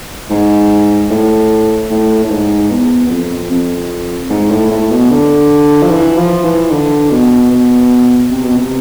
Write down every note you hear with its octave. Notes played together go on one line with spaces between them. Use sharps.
G#2
A2
A2
A2
G#2
E2
E2
F2
F2
G#2
A2
A2
B2
D3
F3
E3
F3
E3
D3
B2
B2
C3
B2
C3